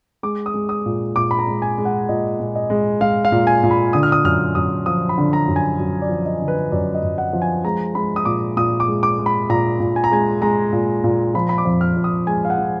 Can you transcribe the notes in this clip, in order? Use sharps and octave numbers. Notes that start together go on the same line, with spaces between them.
G#3 D6
D#6
G#3
D#6
A#2
A#2 D6
B5
A#5
G#3
G#5
G#3
F#5
A#2 D#5
A#2
D#5
G#3
G#3 F5
F5
A#2
G#5
A#2
B5
D3 D#6
F6
D#6
F#2 F6
F#2 D#6
F3 D#6
B5
D3
A#5
F#2
G#5
F#2
D5
F3
D#5
D3
B4
F#2 D5
D#5
F#2
F#5
F3
G#5
G#3 A#5
G#3 B5
D#6
A#2 D6
A#2 D#6
D6
G#3
D6
G#3
B5
A#2 A#5
A#2
G#5
A#5
G#3 G#5
G#3 A#5
A#2
A#2
F3 B5
B5
D6
F2
F6
F2
D#6
G#3 G#5
F5
F#5
F3